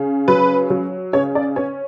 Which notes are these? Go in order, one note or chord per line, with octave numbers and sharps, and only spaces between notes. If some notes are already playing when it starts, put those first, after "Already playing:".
Already playing: C#3
F#3 B4
F#3
C#3 C#5
D5
C#4 C#5